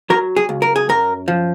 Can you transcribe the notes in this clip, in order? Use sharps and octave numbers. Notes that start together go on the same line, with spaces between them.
F#3 A#4
G#4
C#2
A#4
G#4
F#2 A#4
F3